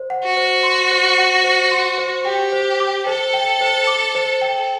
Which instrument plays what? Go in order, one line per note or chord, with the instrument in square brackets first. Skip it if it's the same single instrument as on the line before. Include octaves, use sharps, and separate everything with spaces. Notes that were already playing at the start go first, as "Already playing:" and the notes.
Already playing: [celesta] C5
F#5
[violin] F#4
[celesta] C5
C6
C5
F#5
C5
C6
C5
[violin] G4 [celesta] G5
[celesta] C5
D6
[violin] A4 [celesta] C5
[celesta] G5
C5
D6
C5
G5